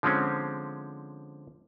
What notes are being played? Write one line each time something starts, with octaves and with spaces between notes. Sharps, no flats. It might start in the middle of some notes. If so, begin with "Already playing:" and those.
D3 F3 G#3 C4 C#4